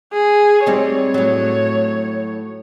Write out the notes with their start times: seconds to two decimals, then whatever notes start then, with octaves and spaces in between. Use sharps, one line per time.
0.13 G#4
0.66 G3 C4 D#4 C#5
1.14 A2 F#3